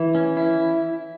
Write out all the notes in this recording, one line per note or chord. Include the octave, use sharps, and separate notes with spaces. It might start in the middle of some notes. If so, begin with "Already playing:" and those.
Already playing: E3 E4
C#4
E4